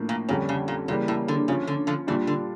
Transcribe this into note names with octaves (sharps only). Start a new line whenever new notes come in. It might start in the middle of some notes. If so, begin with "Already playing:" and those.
Already playing: A2 F3 A#3 D4
A#2
F2 A#2 D3 G3 C#4
C#3
A#2
A#2 C#3 E3 G3 A#3
A2
D3
C#3 F3 C#4 F4
D3
D3 F3
A#2 C#3 E3 G3 D4 F4
D3